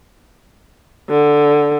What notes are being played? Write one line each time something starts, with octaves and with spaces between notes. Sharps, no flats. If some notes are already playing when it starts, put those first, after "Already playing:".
D3